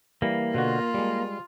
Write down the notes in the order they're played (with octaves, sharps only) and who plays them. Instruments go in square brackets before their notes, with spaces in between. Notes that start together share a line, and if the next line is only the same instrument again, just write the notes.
[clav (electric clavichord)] E3 G3 [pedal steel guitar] A#3
[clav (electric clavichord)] B2 D3 F#4 [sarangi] F4
[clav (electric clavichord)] G3 G#3